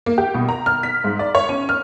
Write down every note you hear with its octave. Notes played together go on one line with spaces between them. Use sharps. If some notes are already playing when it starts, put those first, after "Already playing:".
A#3
G4
B2
A#5
F6
B6
G#2
D5
C#5
C#4
F6